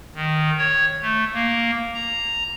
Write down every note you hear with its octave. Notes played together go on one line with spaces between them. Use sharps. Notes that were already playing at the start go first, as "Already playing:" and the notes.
D#3
C#5
A3
A#3
A#5